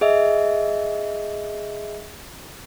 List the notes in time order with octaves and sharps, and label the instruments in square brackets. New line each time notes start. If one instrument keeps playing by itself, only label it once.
[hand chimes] G#4 D#5 E5